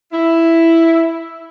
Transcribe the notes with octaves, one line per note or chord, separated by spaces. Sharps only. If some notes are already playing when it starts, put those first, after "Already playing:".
E4